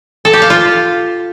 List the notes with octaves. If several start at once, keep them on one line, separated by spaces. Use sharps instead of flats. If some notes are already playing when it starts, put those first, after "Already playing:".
A4
G4
F5
F4